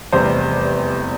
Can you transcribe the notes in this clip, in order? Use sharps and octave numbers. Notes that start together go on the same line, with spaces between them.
F1 E2 C3 G3 C5